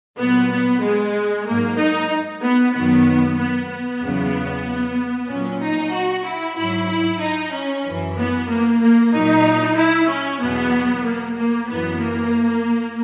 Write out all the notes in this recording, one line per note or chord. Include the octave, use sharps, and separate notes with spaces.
A#2 F#3 B3
B3
G#3
G#2 F#3 A#3
D#4
B3
F#2 D#3 F#3 B3
B3
B3
E2 C#3 F#3
A#2 F#3 C#4
D#4
F#4
E4
G#2 F#3 E4
E4
D#4
C#4
F#2 E3
B3
A#3
A#3
A#2 F#3 D#4
E4
C#4
E2 B2 F#3 B3
A#3
A#3
F#2 E3 B3
A#3